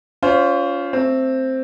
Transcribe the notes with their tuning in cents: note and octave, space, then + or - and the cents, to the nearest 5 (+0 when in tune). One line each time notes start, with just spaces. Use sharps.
C#4 +30 F4 +0 C5 +0
A3 +25 C4 +0